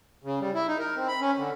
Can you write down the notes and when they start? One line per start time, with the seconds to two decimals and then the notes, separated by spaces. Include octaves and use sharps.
0.24 C#3
0.40 G3
0.54 E4
0.68 D#4
0.79 A#4
0.96 C4
1.08 B5
1.21 C#4
1.38 D3